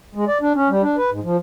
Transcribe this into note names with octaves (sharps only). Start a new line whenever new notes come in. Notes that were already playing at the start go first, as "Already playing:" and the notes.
G#3
D5
D4
C#4
G3
D4
B4
G#2
F3